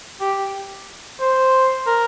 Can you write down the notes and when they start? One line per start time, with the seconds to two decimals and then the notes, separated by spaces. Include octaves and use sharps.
0.21 G4
1.20 C5
1.86 A#4